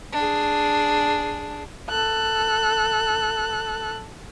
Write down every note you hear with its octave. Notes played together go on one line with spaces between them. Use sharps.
D4 G#4
A4 F#6